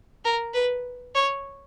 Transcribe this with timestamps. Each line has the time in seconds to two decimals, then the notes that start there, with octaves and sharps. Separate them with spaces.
0.25 A#4
0.54 B4
1.15 C#5